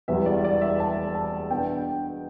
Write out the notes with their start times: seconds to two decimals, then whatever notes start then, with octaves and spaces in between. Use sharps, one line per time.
0.08 E1 E2 E3 G3 B3 E5
0.26 D5
0.44 D5
0.61 E5
0.80 A5
1.15 A5
1.50 B2 B3 D4 G5